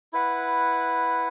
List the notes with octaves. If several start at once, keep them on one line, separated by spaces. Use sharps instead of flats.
E4 B4 F#5